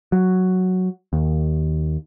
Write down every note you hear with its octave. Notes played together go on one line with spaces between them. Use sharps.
F#3
D#2